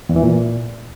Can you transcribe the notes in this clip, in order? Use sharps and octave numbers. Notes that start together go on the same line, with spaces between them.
E2
E3
A#2